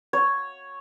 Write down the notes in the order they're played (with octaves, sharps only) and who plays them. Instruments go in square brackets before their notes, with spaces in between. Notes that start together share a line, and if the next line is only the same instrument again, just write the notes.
[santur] C#5